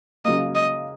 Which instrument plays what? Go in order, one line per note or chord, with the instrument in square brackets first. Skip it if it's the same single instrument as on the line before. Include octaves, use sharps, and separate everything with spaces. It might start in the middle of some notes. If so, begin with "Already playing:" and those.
[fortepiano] C#3 F#3 A#3 [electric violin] D#5
[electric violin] D#5